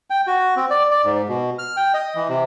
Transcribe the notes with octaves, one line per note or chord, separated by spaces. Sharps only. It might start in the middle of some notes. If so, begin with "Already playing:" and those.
G5
F#4
C4
D5
D5
G#2
B2
F6
G5
D#5
E3
C3